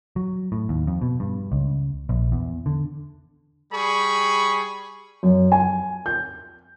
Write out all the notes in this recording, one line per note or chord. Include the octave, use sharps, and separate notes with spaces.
F#3
A2
D#2
F2
B2
G2
C#2
A#1
E2
D3
G3 G#4 B5 C#6
F#2
G#5
G6